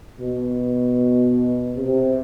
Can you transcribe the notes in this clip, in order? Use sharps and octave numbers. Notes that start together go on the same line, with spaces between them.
B2
C3